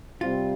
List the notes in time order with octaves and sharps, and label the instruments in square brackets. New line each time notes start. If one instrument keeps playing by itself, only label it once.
[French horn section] C3 G3 C4 [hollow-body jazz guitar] F4